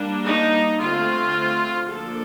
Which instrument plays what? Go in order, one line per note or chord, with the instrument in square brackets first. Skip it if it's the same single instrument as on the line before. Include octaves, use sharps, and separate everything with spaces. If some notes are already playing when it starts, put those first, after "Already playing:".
Already playing: [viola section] G3 A#3 D4
D#4
D3 A3 C4 F4
F3 A#3 D4 A4